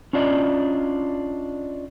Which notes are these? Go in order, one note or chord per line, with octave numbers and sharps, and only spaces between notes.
C#4 D4 F4 D5 D#5